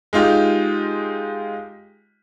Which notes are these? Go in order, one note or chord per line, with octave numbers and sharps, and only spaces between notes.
G#3 D#4 F4 G4